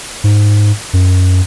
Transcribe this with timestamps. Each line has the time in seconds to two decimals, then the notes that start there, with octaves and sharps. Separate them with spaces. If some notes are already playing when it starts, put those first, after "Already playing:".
0.24 G#2
0.93 F#2